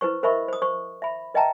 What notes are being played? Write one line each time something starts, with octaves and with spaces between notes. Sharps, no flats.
E4 B4 C5 C#6
A#4 C5 D#5 E5 B5 C#6
C5 D#6
C5 C#6
E5 B5
B4 D#5 E5 G5 A5 A#5